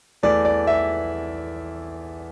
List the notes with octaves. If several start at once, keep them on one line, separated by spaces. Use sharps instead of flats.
E2 E3 A3 D5
D5
E5